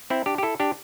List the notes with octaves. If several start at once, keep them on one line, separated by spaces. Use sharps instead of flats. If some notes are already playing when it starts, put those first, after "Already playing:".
C4 E4
D4 G4
G4
E4 A4
D4 G4